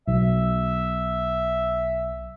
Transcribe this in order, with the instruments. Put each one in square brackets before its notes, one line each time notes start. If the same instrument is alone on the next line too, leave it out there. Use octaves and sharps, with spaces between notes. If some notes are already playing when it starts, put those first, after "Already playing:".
[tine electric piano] B1 [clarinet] E5